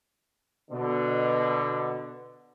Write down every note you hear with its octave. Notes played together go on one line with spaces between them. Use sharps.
B2 D3